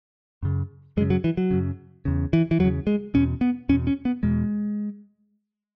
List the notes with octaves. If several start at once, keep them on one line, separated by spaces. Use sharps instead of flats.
F#2 C#3
F#2 C#3 G#3
F#3
E3
F#3
F#2 C#3
E2 C#3
E3
E3
E2 C#3 F#3
G#3
E2 B2 C#4
B3
E2 B2 C#4
C#4
B3
E2 B2 G#3